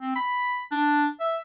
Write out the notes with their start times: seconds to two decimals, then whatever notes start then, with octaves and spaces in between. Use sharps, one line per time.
0.01 C4
0.16 B5
0.72 D4
1.20 E5